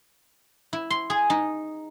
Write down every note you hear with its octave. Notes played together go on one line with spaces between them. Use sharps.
E4
C6
G#4
D#4